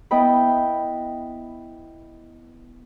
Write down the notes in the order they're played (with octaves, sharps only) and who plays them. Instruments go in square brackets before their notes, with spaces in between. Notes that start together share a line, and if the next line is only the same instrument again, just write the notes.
[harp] B3 E4 D#5 G5 B5